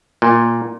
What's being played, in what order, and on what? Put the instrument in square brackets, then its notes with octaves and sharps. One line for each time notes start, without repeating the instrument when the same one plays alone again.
[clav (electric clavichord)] A#2